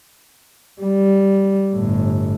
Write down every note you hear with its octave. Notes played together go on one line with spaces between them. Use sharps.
G3
G1 A2